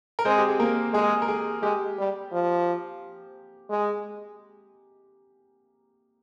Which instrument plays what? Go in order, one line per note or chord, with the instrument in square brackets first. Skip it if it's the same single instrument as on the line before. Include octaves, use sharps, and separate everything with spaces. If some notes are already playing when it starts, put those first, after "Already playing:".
[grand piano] A#4
[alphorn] G#3 [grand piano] C4 C5
[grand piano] G4
G#4
A#3 A#4
[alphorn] G#3 [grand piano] G#4
[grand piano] A#4
G#4
[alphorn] G#3 [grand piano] G4
[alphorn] G3
F3
G#3